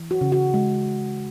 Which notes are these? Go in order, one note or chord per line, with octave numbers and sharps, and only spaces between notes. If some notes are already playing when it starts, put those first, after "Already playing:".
Already playing: E3
F#4
C#3
F#4
G#3